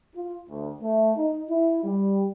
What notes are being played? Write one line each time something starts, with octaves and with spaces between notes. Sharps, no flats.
F4
D2
A3
D#4
E4
G3